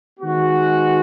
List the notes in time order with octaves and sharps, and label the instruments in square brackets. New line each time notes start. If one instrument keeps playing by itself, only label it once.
[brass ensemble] D#3 G#3 B3 F#4